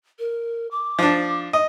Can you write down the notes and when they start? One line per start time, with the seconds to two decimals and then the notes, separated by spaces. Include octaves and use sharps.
0.19 A#4
0.71 D6
0.99 F3 D4
1.53 D#5